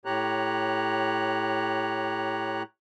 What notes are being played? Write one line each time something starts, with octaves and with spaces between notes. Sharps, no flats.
A2 G4 C#5 A#5 F#6